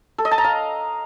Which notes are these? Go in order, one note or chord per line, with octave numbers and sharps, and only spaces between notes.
A4
D#5
A5
A#5
F5